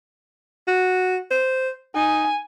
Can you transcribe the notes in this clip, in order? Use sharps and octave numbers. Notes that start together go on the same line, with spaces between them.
F#4
C5
D#4 G#5